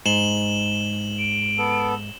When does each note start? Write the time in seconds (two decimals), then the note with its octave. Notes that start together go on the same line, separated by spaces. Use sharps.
0.06 G#2 E7 F#7 G7
1.19 D7
1.58 B3 A4